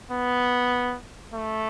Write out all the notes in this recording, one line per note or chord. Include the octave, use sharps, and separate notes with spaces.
B3
A3